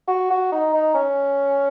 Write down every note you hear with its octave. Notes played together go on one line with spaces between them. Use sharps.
F#4
F#4
D#4
D#4
C#4